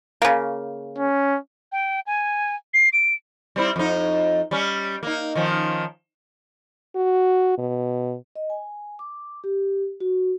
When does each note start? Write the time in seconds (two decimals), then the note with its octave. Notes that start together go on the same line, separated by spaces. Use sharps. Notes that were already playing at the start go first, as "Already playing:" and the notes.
0.22 C#3 A#3
0.98 C#4
1.72 G5
2.07 G#5
2.74 C7
2.93 D7
3.56 G3 C4 E4
3.76 F2 D#4
4.51 G3 C#4
5.03 A#3 D#4
5.35 D#3 F3 C#4
6.96 F#4
7.58 B2
8.36 D#5
8.50 G#5
8.99 D6
9.44 G4
10.00 F#4